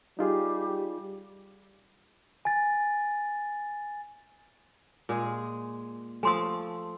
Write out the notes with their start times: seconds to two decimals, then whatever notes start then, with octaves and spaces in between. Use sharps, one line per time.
0.19 G3 D#4 F4 G4 G#4
2.45 G#5 A6
5.09 A#2 G#3 G#4
6.23 F3 A3 G#5 C6 D#6